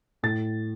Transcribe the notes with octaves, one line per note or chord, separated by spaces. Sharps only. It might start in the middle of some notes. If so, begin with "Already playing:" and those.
A2 A6